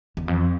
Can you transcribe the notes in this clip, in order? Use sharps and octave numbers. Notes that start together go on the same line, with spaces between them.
E2
F2